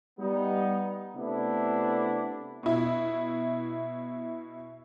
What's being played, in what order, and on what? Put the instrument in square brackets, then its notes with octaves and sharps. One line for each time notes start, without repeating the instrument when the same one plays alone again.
[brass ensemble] G3 B3 D#4
C3 A3 B3 D4 E4
[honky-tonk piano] B2 E4